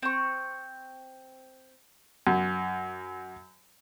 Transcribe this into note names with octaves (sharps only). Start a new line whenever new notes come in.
C4 C#6
F#2